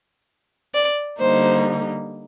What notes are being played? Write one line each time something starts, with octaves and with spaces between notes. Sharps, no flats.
D5
D3 G3 A#3 D#4 C5